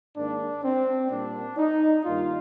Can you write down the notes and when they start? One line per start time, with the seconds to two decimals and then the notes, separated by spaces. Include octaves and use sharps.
0.15 G#2 D#3 A#3 D4
0.63 C4
1.10 A#2 G3 A#3 D4
1.57 D#4
2.04 G2 D#3 G3 A#3 F4